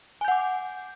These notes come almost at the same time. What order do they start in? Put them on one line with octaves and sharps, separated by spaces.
G#5 G6 F#5 D6